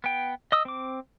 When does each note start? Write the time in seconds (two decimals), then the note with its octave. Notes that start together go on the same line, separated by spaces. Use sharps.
0.04 B3 G5
0.52 D#5 D#6 E6
0.65 C4 D6